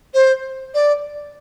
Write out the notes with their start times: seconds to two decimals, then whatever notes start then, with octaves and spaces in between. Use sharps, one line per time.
0.14 C5
0.74 D5